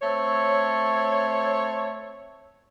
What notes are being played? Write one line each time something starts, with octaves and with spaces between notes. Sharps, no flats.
A3 C4 C#5